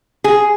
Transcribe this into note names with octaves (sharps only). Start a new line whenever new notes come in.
G#4